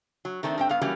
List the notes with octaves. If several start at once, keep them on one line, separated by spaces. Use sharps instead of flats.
F#3
D#3 A3 C4 D4
G2 C4 G5
G2 B3 F5
E3 F#3 G3 A#3 C#4